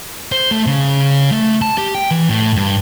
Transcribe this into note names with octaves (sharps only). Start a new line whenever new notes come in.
C5
A3
C#3
A3
A5
G4
G5
E3
A2
G2